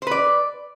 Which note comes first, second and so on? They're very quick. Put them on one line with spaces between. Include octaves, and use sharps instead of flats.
C5 B4 D5